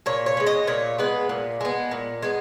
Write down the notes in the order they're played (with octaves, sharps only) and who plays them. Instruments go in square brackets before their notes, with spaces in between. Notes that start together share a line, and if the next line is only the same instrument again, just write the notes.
[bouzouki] A#2 C#5
C#5
G#3 B3
D#5
A#2 C#5
G#3 B3 B4
A#2
G#3 B3
A#2
G#3 B3